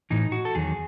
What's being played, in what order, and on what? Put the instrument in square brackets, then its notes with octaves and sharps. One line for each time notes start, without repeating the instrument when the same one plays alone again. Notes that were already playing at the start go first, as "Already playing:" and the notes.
[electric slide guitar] A2 E3 D#4
F#4
A4
E2 D#3 F#3 G#4